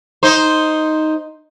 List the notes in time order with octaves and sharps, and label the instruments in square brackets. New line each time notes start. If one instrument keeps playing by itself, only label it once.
[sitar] D#4 C5